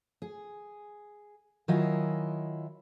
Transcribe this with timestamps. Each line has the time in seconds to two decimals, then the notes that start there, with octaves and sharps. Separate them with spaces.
0.22 G#4
1.68 D#3 F#3 E4 F4 D#5 G#5